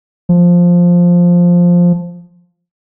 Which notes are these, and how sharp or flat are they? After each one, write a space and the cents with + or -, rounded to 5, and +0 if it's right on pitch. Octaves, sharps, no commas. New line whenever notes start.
F3 +5